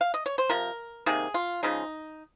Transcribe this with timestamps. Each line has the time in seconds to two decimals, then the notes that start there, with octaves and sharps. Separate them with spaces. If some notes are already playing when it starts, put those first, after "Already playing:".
0.01 F5
0.14 D#5
0.26 C#5
0.38 C5
0.49 C3 F3 A#4
1.06 C3 D#3 A#3 G#4
1.34 F4
1.63 C#3 F3 G#3 D#4